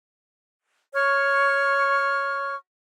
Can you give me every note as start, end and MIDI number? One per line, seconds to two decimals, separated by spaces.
0.94 2.55 73
0.94 2.55 85
0.94 2.55 89